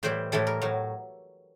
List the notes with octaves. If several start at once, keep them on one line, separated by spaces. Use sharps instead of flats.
A2 E3 G3 C5
A2 E3 G3 A4
A#4
A2 F#3